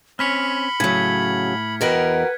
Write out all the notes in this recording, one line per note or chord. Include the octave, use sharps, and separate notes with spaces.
C4 C#4 C#5 B5 F6 B6 C#7
A2 C#3 F#3 G#6
E2 F#4 A#4 B4 D#5 G5 B5